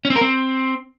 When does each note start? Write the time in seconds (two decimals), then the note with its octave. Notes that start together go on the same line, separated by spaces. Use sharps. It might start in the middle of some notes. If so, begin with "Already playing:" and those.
0.05 C#4
0.10 C4
0.16 A#4
0.21 C4